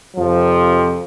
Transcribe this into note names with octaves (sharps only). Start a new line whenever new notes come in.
F2 C3 F3